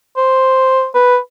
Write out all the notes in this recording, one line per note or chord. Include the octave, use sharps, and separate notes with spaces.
C5
B4